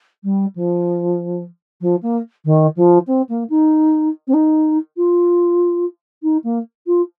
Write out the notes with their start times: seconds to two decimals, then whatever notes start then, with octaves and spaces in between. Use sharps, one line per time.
0.24 G3
0.56 F3
1.81 F3
2.03 A#3
2.45 D#3
2.76 F3
3.07 C4
3.29 A#3
3.50 D#4
4.28 C4
4.34 D#4
4.97 F4
6.23 D#4
6.44 A#3
6.87 F4